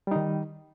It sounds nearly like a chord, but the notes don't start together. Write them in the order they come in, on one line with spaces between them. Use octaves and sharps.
G3 D#4 D#3